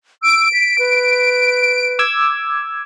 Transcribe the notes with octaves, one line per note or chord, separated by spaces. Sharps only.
E6 D7
B6
B4
D6 E6 G#6